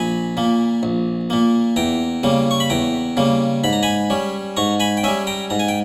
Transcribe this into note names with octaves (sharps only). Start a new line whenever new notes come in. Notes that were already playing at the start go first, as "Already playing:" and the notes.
Already playing: A#1 G#5 B5
A#2 A#3
A#1
A#2 A#3
E2 G5 A#5
C#3 G3 A#3
C#6
B5
E2 G5 A#5
C#3 G3 A#3
G#2 B5
A#5
G#5 B5
G3 C#4
G#2 A#5 C#6
G#5 B5
G5
G3 C#4 E5 G#5
G5 A#5
G#2 A#5
G#5
G5